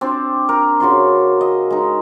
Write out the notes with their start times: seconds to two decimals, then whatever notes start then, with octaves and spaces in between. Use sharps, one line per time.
0.01 C4 D4 D5
0.49 A#4
0.80 C#3 F#4 D5 C6
1.41 D#5
1.70 G#3 D#4